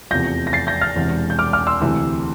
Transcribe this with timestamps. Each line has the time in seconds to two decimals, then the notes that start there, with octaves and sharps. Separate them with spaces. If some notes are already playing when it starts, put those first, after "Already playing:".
0.11 F1 E2 C3 F3 G6 A#6
0.47 A#6
0.53 A6 C7
0.67 G6 A#6
0.81 F6 A6
0.96 E1 E2 C3 E3
1.30 G6
1.39 D6 F6
1.53 D6 F6
1.67 C6 E6
1.81 D2 C3 E3